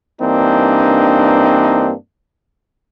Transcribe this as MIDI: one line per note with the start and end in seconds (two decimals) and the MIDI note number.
0.21 1.92 43
0.21 1.92 52
0.21 1.92 58
0.21 1.92 60
0.21 1.92 62
0.21 1.92 63